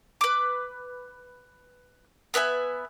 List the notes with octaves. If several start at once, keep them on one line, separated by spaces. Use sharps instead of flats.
B4 D6
B3 B4 E5 G#5